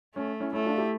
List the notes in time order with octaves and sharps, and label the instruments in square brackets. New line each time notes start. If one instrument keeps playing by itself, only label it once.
[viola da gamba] A3 [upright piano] C#4
[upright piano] C#4 E4
[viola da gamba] A3 [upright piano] C#4 E4
[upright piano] D4 F4
E4 G4